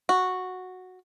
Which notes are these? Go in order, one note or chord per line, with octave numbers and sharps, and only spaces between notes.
F#4